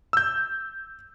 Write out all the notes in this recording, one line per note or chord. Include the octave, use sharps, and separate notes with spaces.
E6 G6